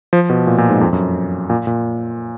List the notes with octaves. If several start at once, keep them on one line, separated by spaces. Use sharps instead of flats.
F3
B2
A#2
A#2
G#2
F2
F#2
A#2
A#2